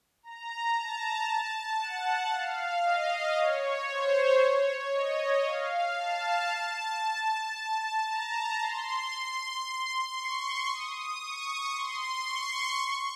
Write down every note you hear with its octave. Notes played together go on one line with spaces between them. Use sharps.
A#5
A5
F#5
F5
D#5
C#5
C5
C#5
D#5
F5
A5
A#5
C6
C#6
D#6
C#6
C6
C#6
C#6